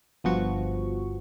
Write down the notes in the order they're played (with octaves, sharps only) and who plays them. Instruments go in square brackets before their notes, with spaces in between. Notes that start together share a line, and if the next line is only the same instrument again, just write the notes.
[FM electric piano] G1 F3 B3 F#4 C#6